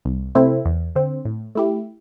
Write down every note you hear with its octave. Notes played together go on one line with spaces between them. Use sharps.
C2
C3 A3 C4 E4
E2
D3 C4
A2
A3 E4 G4